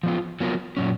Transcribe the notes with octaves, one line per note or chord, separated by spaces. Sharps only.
F3 B3 F4
F#3 B3 F4 A#4
A#2 F#3 C#4